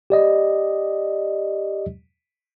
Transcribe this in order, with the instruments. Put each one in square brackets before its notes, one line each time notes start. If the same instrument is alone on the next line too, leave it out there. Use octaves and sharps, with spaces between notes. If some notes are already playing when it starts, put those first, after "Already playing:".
[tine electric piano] G4 D5 D#5